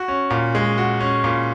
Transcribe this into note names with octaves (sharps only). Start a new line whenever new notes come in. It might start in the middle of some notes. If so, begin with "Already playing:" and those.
Already playing: F#4
C#4
A#2
G#3
F#4
C#4
A#2